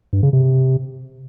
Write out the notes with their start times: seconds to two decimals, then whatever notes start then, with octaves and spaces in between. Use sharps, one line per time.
0.13 G2
0.23 C#3
0.33 C3